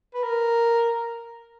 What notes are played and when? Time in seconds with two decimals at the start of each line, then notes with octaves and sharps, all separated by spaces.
0.14 B4
0.23 A#4